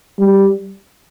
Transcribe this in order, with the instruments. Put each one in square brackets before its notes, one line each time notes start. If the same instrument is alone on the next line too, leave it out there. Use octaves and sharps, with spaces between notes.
[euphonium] G3